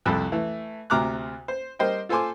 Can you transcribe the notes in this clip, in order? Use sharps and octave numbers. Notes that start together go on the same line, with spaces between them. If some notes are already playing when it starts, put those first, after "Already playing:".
C2 F2 A4 B5 F#6
E3 A3
D2 C3 A#5 D6 F6 F#6
C5
G3 A#4 C5 D#5 G5
F4 A4 C5 G#5 C6 D6